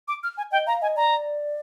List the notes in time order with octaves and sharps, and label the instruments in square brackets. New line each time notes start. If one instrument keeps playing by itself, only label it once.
[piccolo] D6
F6
G#5
[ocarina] D#5 [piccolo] G5
[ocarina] F5 [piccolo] A#5
[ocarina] D#5 [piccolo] G#5
[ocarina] D5 [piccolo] A#5